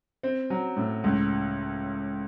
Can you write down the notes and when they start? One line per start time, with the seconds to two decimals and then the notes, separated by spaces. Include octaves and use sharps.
0.23 C4
0.50 F#3
0.76 A2
1.04 C#2